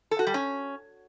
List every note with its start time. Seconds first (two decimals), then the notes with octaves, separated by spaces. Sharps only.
0.11 A4
0.19 F#4
0.27 G3
0.34 C#4